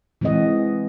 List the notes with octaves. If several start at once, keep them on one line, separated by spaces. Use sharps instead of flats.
E3 G#3 C4 G#4 D#5 F#5